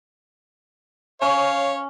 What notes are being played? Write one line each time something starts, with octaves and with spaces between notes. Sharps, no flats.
C#4 C#5 F5